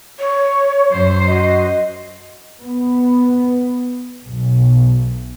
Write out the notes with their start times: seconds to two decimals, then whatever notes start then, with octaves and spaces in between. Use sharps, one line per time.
0.19 C#5
0.91 F#2 C5
1.28 F#4 D#5
2.62 B3
4.26 B1